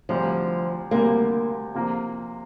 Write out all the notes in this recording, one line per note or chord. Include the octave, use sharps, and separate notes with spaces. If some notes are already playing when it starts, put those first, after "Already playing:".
D2 C3 F3 G3
D2 C3 G3 A#3
C3 F3 A#3